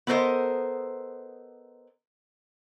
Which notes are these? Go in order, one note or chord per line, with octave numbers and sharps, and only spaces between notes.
B3 A4 A#4 C5 D#5